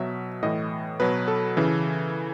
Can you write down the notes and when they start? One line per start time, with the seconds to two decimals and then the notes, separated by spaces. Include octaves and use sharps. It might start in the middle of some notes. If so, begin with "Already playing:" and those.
Already playing: B2 F#3 E5
0.43 A2 E3 D#5
1.00 B2 F#3 B4
1.28 A4
1.57 C#3 E3